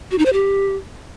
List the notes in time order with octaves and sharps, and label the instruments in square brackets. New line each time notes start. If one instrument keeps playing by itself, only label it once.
[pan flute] F#4
D#4
C5
G4